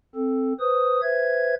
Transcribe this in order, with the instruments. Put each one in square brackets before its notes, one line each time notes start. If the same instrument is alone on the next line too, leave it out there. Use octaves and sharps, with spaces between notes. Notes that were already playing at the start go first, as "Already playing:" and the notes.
[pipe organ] C4 A4
B4 C5 D#6
B4 C5 E5 G#6